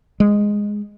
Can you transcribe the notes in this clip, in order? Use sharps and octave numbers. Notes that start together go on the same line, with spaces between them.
G#3